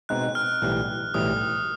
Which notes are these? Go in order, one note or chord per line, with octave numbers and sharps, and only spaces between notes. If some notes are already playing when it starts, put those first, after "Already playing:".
B2 G#3 C4 D#4 F#6
F6
B1 A2 E3 G3
B1 A2 E3 G3 D#6